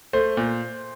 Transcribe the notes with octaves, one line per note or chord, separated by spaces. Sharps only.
A3 C5
A#2